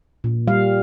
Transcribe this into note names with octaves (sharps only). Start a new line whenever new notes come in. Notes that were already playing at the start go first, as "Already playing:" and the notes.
A#2
G3 F5